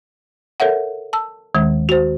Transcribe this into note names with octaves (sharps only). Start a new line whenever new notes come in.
A4 A#4 C#5 E5 F#5
A5 E6
D#2 D#3 G#3
F#4 C5